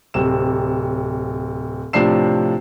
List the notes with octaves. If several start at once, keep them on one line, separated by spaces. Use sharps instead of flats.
D1 C3 E7
A2 C3 F3 D4 C7 E7